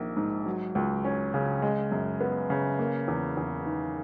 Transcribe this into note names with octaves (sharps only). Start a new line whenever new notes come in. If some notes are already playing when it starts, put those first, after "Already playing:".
Already playing: A#1 D#3 A#3
G#2
F#3
C#2
C#4
C#3
G#3
F#2
B3
C#3
A#3
E2
E2
D#3